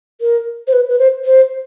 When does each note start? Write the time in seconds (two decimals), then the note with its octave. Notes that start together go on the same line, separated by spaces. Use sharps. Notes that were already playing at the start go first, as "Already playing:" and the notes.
0.21 A#4
0.67 C5
0.73 B4
0.88 B4
0.99 C5
1.25 C5